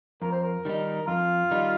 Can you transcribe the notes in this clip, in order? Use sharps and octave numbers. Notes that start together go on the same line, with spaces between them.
F2 A#4
C5
A#4
D#3 G3 D#4
F2 F4
D#3 G3 D#4